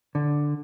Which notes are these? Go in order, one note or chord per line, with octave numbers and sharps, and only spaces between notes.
D3